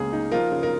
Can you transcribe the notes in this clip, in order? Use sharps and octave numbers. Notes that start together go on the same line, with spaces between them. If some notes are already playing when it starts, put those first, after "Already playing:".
Already playing: C#2 C#3 A#3 G#4
D#4
F3 F4 A#4
C#3
A#4